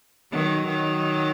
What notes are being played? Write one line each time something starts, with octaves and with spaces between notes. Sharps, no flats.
D#3 F#3
D#3 F#3